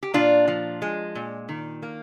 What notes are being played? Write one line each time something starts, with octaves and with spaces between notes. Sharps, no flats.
G4
A#2 D4 F4
F3
G#3
A#2
D#3
A#3